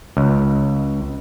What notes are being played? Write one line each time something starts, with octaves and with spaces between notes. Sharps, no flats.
C#2